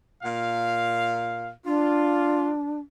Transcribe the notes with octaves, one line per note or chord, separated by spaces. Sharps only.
A#2 F5
D4 F4